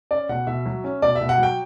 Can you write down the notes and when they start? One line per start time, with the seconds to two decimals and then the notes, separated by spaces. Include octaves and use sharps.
0.11 C#4 D5
0.29 B2 F#5
0.47 B2 E5
0.66 F#3
0.84 C#4
1.02 B2 D5
1.15 E5
1.21 B2
1.29 F#5
1.38 F#3 G5